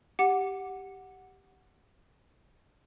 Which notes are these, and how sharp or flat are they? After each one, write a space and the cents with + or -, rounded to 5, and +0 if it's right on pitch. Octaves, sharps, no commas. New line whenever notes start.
G4 +0 F#5 +0 D6 +0